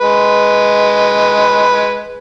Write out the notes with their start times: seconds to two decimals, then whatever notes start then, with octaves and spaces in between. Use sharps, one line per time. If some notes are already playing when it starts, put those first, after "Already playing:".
0.01 G#3 B4